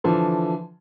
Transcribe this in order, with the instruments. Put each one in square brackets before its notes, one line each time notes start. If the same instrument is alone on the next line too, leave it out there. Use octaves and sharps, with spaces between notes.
[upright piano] D3 E3 F3